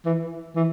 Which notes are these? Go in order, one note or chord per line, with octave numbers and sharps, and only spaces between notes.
E3
E3